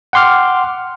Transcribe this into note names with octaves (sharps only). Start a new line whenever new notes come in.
F#5 G5 C6 D6 F6